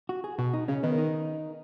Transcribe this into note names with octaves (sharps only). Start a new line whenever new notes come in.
F#4
G#4
B2 F#4
D#4
C#3 C#4
D#3 B3
D#4